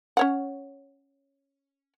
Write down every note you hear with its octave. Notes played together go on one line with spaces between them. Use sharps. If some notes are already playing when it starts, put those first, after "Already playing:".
C#4 C#5 F#5